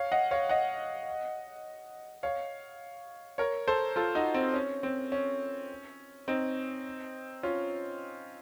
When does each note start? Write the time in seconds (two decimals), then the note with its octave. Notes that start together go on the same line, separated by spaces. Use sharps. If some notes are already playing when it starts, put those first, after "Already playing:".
Already playing: C#5 F5
0.12 D#5 F#5
0.31 C#5 F5
0.49 D#5 F#5
2.23 C#5 F5
3.38 A#4 C#5
3.68 A4 C5
3.96 F4 A4
4.15 D#4 F#4
4.34 C4
4.54 C#4
4.83 C4
5.12 C#4
6.28 C4 D#4
7.43 C#4 F4